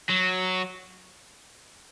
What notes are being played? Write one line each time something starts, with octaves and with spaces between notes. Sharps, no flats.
F#3